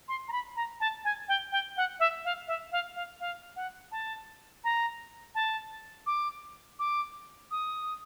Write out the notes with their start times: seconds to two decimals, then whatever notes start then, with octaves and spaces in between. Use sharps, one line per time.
0.08 C6
0.28 A#5
0.32 B5
0.56 A#5
0.80 A5
1.04 G#5
1.29 G5
1.52 G5
1.77 F#5
2.00 E5
2.25 F5
2.48 E5
2.72 F5
2.96 F5
3.20 F5
3.56 F#5
3.92 A5
4.64 A#5
5.35 A5
6.06 D6
6.79 D6
7.51 D#6